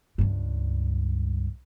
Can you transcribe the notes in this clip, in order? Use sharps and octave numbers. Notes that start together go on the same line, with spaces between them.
C#2 G2